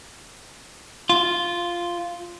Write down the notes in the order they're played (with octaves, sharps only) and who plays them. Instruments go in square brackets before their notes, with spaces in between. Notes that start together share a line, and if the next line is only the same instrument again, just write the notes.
[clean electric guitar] F4